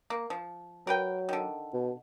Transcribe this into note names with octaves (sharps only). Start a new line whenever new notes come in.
A#3
F3
F#3 A#4 B4 G5
D3 D#3
B2